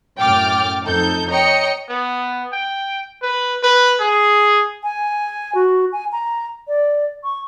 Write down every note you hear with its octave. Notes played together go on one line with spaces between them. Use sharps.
F#2 A2 G5 D6 F6 A6
F2 D#4 A4 G6
C#5 D#5 G5 A#5 C#7
B3
G5
B4
B4
G#4
G#5
F#4
G#5
A#5
D5
C#6